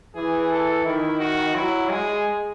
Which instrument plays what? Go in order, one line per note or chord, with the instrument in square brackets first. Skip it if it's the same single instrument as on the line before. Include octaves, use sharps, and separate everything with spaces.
[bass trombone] E3 [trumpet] G#4
[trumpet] A4
[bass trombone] D#3 [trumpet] E4
[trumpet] F#4
[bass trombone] F#3 [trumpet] E4
[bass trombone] G#3 [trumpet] G#4